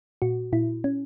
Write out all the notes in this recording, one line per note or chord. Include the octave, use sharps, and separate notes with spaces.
A#2 F#4
A#2 E4
C#4